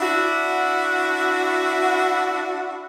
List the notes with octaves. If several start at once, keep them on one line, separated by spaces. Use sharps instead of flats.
D4 E4 F#4